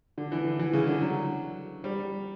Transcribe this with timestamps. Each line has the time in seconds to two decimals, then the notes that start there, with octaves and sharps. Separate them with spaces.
0.18 D3
0.32 E3
0.45 D3
0.59 E3
0.73 C#3
0.87 D3
1.01 F#3
1.84 G3